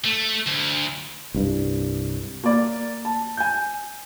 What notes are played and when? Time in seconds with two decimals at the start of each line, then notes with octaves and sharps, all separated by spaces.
0.05 A3
0.46 D2
1.34 C2 G2
2.44 A#3 D5
3.05 A5
3.37 G#5 G6